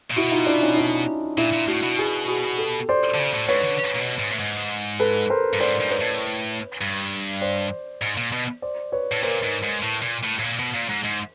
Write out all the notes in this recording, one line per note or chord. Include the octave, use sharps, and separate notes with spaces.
A#2
B2 E4 F#4
D#4 F4
D4 E4
C#4 D#4
D4 E4
A#2 D4 E4
A#2
A2 E4 F#4
B2
F#4 G#4
F#4 G#4
G4 A4
C5 D5
D3
C#3
A2
G#2 B4 C#5
D3
A#2
B2
G#2
A2
G#2
A4 B4
A#4 C5
G2
G#2 C5 D5
G#2
B4 C#5
A2
G2
C5 D5
G#2
A#2
B2
C5 D5
B4 C#5
A2
A#2 A#4 C5
G#2
G#2
A2
A#2
A2
A2
A#2
B2
A#2
G#2
G#2